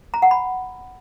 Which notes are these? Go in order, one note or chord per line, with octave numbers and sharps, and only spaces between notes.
A#5
F#5
B5